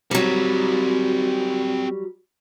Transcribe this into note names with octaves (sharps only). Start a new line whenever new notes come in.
F#3 G3 C4 A#4